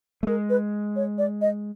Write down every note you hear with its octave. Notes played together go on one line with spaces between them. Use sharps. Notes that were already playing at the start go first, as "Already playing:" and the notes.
A3
G#3 A#4
B4
C#5
D5
D#5